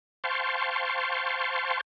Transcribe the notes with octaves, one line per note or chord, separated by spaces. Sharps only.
C5 F5 G5 A5 C6 C#6